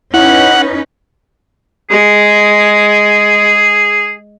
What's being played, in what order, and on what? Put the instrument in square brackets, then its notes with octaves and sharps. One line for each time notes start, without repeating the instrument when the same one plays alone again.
[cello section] C#4 D#4 B4 [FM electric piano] E4 [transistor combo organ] F#5
[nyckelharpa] G#3 [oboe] G#4